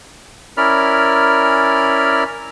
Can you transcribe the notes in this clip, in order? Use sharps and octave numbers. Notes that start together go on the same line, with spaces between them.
C#4 E4 A#4 D5 B5 F6